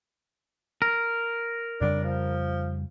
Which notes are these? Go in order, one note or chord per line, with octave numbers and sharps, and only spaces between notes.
A#4
F2 C#3 G3 D4
F3